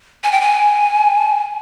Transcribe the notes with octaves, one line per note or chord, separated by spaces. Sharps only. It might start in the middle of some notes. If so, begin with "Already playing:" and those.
G#5
G5
G#5